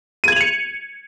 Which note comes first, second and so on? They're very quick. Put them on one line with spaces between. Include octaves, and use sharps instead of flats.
D#7 G#6 F#7 F7 C#7